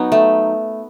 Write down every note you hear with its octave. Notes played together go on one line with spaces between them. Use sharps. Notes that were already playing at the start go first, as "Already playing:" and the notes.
Already playing: F#3 B3 D#4
A3